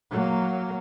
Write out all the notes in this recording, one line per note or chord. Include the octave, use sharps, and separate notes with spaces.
F#3 A#3